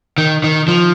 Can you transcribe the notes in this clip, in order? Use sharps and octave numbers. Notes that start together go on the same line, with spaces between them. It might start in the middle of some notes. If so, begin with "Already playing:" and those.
D#3
D#3
F3